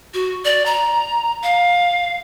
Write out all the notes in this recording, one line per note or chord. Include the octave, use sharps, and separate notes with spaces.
F#4
D5
A#5
F5